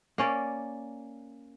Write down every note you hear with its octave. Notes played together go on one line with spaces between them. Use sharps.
A#3 C#4 D5